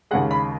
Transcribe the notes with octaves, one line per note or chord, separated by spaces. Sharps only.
D#2 C#3 G#3 F#5
B5